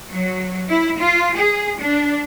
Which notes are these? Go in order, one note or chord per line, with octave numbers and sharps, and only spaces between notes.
F#3
E4
F4
G#4
D4